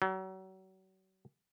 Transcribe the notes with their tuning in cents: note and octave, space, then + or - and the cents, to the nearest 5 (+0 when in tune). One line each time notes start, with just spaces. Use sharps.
F#3 +35